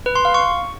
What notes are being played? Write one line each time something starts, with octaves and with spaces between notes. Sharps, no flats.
B4
C6
F5
C#6